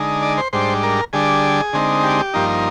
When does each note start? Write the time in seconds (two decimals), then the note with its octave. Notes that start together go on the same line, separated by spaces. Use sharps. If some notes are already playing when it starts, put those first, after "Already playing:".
Already playing: D3 G#3 D#4
0.22 D5
0.38 C5
0.53 G#2 G3 D4 C5
0.83 A#4
1.13 D3 G3 D4 G#4
1.73 D3 G#3 C4 D#4
2.03 G4
2.34 G2 F3 A#3 D#4